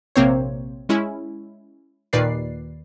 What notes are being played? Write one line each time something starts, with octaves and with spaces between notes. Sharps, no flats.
A#1 C3 A#3 C4 C5 C#5
G#3 C#4 E4
D#2 A#2 D#3 B4 D5 C7